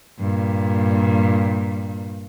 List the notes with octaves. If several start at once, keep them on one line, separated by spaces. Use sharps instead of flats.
G2 A#2